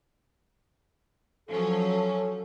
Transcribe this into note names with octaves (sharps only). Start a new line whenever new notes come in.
F3 F#3 C#4 A4